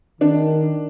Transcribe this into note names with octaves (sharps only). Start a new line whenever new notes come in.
D#3 D4